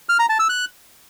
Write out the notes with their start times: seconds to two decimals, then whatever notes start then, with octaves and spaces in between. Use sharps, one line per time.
0.09 F6
0.19 A#5
0.29 A5
0.39 E6
0.49 F#6